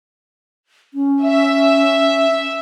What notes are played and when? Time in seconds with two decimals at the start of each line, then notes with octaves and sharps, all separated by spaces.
0.94 C#4
1.24 E5